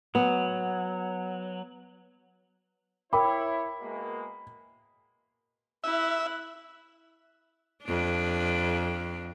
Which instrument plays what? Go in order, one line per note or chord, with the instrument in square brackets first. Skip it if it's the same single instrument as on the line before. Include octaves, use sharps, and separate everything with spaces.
[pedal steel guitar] F#3 [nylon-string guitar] B3
[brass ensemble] E4 C#5 [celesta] A#4 G5 D6 [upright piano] B5
[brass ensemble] B2 G#3 A#3
[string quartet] E4 F#6 [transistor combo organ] E5
[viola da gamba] F2 D4